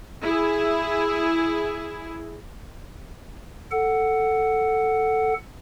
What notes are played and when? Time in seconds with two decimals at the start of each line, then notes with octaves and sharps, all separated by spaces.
0.23 E4 G#4
3.71 A4 F#5